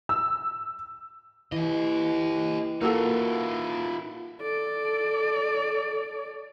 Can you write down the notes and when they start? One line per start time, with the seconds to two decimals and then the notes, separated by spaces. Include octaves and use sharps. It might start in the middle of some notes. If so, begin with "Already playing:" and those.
0.09 E6
1.52 E3 G4 D#5
2.81 A#3 D#4 F4 F#4 A4
4.42 A4 D5